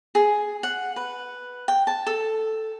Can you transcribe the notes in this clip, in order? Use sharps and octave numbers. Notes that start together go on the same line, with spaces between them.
G#4
F#5
B4
G5
A5
A4